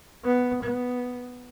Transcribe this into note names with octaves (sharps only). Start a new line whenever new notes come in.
B3
B3